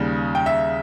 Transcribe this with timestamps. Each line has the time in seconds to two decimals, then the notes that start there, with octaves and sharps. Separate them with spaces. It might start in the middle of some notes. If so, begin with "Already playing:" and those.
Already playing: D#2 C#3 G3
0.35 G5
0.46 E5